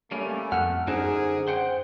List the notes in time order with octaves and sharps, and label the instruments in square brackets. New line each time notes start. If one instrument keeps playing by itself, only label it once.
[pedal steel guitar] G3 A#3 C#4 [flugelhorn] A3
[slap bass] F2 [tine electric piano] F#5 [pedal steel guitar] F6
[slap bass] F#2 [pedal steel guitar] D3 D#4 C5 [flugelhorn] G#4
[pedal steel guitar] C5 F#5 G5